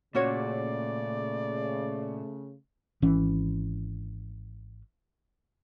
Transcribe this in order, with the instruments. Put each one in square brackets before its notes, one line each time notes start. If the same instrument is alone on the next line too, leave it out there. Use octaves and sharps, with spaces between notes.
[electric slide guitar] A#2 [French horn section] C#3 A3 [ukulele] C#4 F#4 C#5 [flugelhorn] D5
[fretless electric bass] G#1 E3 C#4